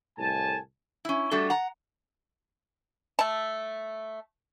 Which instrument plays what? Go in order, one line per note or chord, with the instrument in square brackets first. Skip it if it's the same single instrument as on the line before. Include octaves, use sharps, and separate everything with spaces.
[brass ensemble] C2 A2 G#5 A5
[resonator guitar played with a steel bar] C#4 E4
G3 A3 D4 F#4 A4
F#5 A#5
[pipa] A3 A5